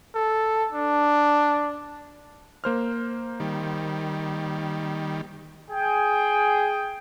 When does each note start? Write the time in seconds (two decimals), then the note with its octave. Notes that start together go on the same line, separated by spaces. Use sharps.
0.15 A4
0.72 D4
2.64 A#3 C5 F6
3.40 D#3 G3
5.71 G#4 G5